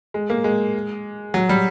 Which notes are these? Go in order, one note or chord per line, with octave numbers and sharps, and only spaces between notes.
G#3
A#3
G#3
F#3
G3